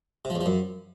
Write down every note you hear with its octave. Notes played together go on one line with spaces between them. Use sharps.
C3
F3
E2
F3
F#2